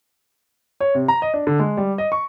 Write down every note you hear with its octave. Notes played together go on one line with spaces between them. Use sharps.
C#5
C3
A#5
D#5
D4
D3
G#3
G3
D#5
C#6